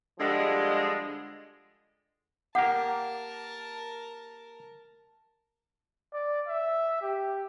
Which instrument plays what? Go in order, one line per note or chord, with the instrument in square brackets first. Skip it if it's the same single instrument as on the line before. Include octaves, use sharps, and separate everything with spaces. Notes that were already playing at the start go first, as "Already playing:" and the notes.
[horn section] D3 F3 G3 G#3
[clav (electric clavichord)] A#3 G4 [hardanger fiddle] A#4 A5 [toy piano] F#5
[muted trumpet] D5
E5
G4